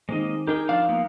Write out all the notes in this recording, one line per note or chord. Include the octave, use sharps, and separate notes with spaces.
D#3 G#3 A#3 C4 D#5
D#4 G4 G#4 A#4 G5
F2 D4 F4 F5
A#3 B3